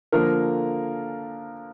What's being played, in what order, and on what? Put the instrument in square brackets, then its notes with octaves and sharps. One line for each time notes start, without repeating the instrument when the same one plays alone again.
[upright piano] D3 F3 A#3 A#4